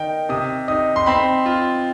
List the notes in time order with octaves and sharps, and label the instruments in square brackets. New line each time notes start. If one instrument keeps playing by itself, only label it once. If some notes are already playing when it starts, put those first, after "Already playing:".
Already playing: [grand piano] D#3 D#4 G5
C3 D#6
D#4 D#6
C6
C4 B5
F4